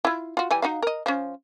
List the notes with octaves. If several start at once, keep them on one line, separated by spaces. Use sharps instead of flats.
E4 F4
F4 F#4
E3 G3 G#5
D#4 F#4 F5
A#4 D#5
F3 C#4